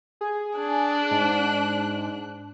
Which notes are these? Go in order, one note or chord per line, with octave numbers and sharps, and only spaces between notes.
G#4
D4 F#6
G#2